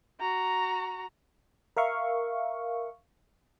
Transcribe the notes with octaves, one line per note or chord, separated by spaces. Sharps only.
F#4 A#5
A#4 E5 F5 C#6